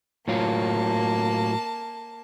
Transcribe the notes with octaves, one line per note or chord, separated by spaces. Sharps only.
A2 F#3 A#3 F4 A5